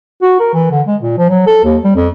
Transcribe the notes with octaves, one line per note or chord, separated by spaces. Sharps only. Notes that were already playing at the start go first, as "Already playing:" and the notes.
F#4
A#4
E3
D3
G#3
A#2
F3
F#3
A4
D#2
G3
F2